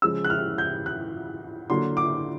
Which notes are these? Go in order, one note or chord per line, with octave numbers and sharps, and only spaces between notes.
C#3 F3 G#3 E6
F#6
F6
G6
F#6
D3 F#3 A#3 C6
D6